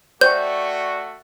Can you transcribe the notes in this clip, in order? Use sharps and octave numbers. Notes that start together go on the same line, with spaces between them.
A3 F#4 C5 D5 G5 C#6 G6